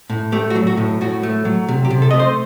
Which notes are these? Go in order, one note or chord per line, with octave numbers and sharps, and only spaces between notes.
A2
A3 G4
F#4
F#3
F#4
A2
A2 F#4
A3
F#3
C3
G4
C3
A4
A3 D#5
C5